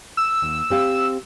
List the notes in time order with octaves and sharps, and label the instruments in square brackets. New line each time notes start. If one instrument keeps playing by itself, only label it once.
[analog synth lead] E6
[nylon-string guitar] D#2
C4 G4 F5